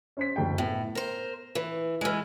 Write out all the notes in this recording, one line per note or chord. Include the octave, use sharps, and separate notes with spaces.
C#4 C5 B6
F#1 D2 G5
A2 B3
A#4 C5
E3
E3 G#3 G#5 E6 F6